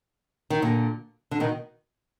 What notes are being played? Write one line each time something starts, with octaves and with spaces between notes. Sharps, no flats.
D#3
A#2 D3
D3
B2 D#3